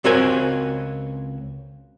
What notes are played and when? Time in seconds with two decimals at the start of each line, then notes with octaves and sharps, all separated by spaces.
0.04 C#2 C4 F#4 A#4 G#5